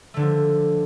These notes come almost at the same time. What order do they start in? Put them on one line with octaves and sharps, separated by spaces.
A3 D3 D4 F3